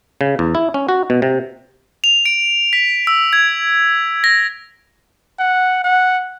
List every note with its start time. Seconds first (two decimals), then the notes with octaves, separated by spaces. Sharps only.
0.21 C#3
0.39 E2
0.55 E4
0.74 C#4
0.89 F#4
1.10 B2
1.22 C3
2.04 F7
2.26 D7
2.73 B6
3.07 E6
3.33 G#6
4.24 A#6
5.39 F#5
5.84 F#5